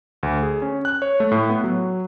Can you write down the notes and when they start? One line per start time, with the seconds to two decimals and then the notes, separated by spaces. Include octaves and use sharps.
0.23 D2
0.43 G#4
0.62 C#4
0.85 F#6
1.02 C#5
1.20 A3
1.32 A2
1.50 B3
1.64 F#3